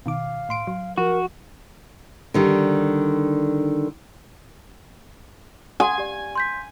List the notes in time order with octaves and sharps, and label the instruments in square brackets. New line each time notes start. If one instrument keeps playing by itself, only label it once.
[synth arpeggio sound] B2 D#3 D6 [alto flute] F5
[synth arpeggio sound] A2 C6 D7
F#3
[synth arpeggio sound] F3 [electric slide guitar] F#4 [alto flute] A#4
[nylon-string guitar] D3 D#3 G3
[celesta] F#5 C6 D#6 [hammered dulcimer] G#5
[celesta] G4 D5
C6 G6 B6